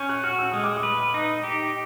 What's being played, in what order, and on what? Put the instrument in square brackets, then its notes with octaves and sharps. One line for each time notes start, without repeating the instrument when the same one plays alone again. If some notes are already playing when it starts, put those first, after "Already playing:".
Already playing: [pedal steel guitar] C#4 [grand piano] G6
[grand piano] F#6
[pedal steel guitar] F#4 [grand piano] F6
[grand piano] E6
[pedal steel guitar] G#3 [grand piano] D#6
[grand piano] D6
D#6
[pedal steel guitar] B4
D#4
G4